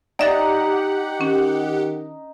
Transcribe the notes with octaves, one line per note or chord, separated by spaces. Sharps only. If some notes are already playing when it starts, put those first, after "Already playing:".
D#4 G4 D5 E5 F#5 A#5 A6
D#3 C#4